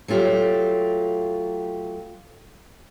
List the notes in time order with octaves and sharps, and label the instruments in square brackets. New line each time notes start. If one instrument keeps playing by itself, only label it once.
[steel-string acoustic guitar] F#3 A3 F4 G4